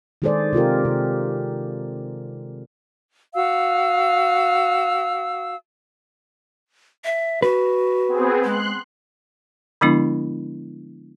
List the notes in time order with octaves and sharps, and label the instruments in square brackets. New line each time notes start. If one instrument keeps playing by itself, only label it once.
[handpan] D#3 G#3 G#4 A4 C5 D5
C3 F4 G4 A#4
C3
[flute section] F#4 F5 E6
[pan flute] E5
[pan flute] F#4 [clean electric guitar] B4
[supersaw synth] B3 C4 G#4
[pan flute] G#3 [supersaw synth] C6 F#6
[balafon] D3 F3 G#3 B3 D4 E4